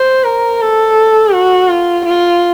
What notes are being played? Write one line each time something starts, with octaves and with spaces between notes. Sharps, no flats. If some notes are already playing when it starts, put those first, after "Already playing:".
Already playing: C5
A#4
A4
F#4
F4
F4